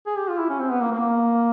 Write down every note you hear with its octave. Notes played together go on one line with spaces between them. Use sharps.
G#4
G4
F4
E4
C#4
C4
B3
A#3
A#3